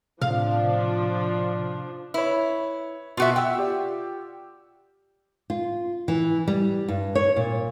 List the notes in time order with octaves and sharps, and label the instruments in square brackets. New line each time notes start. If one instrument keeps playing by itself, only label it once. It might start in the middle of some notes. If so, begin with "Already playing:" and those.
[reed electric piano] A2 C3 [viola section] F3 D4 [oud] F5
[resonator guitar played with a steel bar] E4 [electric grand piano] B4 C#5
[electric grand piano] B2 [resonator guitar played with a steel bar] F4 F#4 E5
[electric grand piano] F#5 E6 [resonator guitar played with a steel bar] G5
[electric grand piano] F4 G4 D5
[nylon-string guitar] F4
E3
G3
G2
C#5
A#2